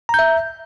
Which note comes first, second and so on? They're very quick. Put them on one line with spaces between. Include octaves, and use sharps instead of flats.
A#5 G6 E5